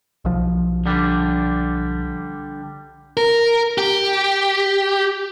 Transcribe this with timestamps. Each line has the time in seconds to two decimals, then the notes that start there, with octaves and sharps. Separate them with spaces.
0.25 B1 F3
0.86 D3 G3 D4
3.17 A#4
3.78 G4